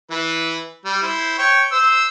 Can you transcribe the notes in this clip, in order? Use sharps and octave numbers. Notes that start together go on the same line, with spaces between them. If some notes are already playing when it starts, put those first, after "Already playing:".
E3 B4
G3
E4 C5
C#5 G5
C5 E6